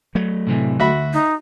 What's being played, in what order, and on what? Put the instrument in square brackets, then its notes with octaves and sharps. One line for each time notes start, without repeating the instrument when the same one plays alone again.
[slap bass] F#3 A3
[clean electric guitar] A2 C3 E3
[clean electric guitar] D2 [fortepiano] F#4 E5 B5
[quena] D#4